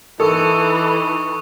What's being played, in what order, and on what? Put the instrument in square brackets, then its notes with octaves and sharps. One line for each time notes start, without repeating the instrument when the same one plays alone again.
[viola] E3 [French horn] D#4 [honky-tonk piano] A4 [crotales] C#6 D#6